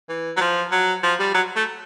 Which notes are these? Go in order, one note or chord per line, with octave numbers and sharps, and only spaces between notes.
E3
F#3
F3
F#3
F3
G3
F#3
A3